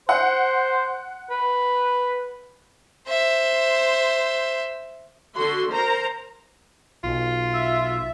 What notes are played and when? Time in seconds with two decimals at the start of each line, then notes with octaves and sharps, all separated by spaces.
0.09 C5 F#5
1.30 B4
3.08 C5 E5
5.35 D3 F#4 C6
5.73 A#4 C5 A#5
7.04 B1 F4
7.53 E5